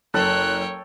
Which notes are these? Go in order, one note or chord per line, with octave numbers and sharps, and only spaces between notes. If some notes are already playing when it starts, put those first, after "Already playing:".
F#1 A4 C#5 G5 F#6